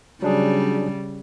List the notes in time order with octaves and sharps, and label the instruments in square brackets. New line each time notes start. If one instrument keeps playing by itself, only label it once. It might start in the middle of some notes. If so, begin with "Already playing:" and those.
[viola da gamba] C#3 G3 [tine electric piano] F#3 D4 G#4